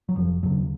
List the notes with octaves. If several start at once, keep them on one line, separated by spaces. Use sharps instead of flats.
F#3
F1 F3
D#2 C#3 F#3